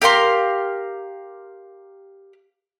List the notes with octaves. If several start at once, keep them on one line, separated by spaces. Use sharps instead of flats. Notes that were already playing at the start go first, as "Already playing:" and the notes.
G4 A#4 F5 C6